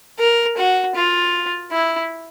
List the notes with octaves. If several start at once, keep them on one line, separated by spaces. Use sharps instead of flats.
A#4
F#4
F4
E4